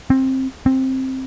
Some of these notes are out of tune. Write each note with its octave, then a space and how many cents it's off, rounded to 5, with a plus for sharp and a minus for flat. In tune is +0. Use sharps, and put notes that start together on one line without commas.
C4 +15
C4 +10